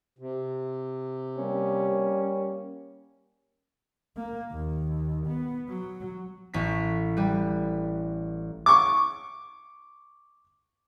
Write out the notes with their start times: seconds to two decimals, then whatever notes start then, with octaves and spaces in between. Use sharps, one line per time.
0.19 C3
1.38 G3 A#3 C#4
4.16 A#3
4.51 D#2
5.27 B3
5.68 F#3
6.54 A1 A2 B6
7.17 G3 B4
8.66 C#6 D6